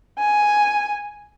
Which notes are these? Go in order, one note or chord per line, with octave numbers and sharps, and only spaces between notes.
G#5